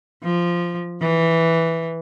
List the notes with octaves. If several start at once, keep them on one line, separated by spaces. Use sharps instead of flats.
F3
E3